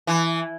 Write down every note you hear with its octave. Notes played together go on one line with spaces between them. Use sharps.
E3